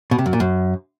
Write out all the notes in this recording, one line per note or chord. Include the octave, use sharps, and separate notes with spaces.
B2
C3
F#2
A#2
F#2